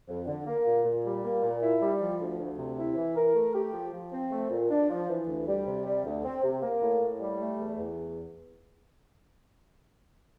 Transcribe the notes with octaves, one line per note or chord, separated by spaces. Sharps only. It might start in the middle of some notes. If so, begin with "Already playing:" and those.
F2
D3
A#3
A#2
A#2
G3
A#3
A#2
E4
G3
F3
D2
D2
C3
E4
E3
A#4
A3
G4
F3
F3
C4
A3
A#2
D4
F3
E3
D2
G3
C3
G3
D2
C4
C3
A#3
A2
A2
G3
A3
E2
E2